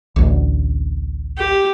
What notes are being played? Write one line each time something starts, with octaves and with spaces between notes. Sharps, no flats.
A1 D2
G4